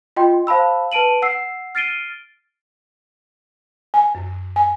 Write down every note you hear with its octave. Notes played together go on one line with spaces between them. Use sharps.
F4 D#5 G5 C6
C5 F5 A5 B5 E6
B4 A5 D7 D#7 F#7
F#5 E6 C7
F6 A6 C7 D7 D#7 G7
G#5
F#2
G#5